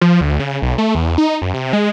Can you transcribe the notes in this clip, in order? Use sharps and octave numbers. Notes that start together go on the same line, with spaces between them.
F3
D2
C#3
B1
A3
E2
D#4
F#2
C3
G#3